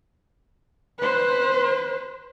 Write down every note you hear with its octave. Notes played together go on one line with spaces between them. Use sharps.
B4 C5